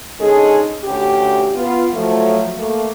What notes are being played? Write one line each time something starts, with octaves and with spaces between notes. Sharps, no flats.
D3 G#3 C#4 D#4 G#4 A4
D2 C#4 G4
B3 F4
F3 F#3 A3
A3 A#3